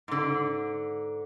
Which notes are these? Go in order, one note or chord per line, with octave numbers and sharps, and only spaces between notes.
G#2 D3